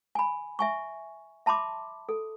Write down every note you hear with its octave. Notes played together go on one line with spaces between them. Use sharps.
G#5 B5
E5 G#5 C#6
E5 A5 B5 C6 D6
A4